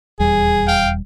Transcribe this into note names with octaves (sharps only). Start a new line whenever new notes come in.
D#1 E2 G3 G#4
F5 G5